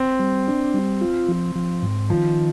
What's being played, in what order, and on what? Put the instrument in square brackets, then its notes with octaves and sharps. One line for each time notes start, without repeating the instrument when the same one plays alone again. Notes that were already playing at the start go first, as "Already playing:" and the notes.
Already playing: [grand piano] C4
[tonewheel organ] G3
D4
G3
F4
F3
F3
G#2
[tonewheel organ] D#3 [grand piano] F3